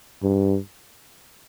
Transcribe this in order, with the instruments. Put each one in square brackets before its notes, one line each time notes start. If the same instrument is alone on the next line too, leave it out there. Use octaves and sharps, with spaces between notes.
[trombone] G2